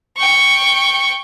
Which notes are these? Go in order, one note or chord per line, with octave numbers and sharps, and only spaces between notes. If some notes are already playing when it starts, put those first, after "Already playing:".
G5 C#6